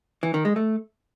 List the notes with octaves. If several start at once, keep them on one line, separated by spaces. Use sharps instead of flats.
E3
D#3
G#3
A3